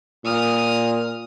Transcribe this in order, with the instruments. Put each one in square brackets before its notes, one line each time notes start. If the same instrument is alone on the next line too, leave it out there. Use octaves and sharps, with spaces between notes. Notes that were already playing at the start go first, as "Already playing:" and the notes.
[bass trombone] A#2 [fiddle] D#6 F6